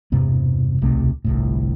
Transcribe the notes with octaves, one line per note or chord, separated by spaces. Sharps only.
E1 G2 C3 B3
D1 B1 C3 A3
G1 C2 A2